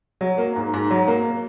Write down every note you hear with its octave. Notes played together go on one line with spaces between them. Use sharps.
F#3
A#3
G#2
G#2
F#3
A#3